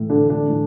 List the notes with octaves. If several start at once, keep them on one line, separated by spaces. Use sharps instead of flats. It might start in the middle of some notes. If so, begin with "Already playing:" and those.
Already playing: A2 E3
D3 D4
D3 D4
A2 E3